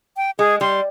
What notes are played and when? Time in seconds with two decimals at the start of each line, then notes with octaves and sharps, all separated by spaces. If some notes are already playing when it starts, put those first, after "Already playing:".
0.17 G5
0.39 G#3 G#4
0.61 G3 C6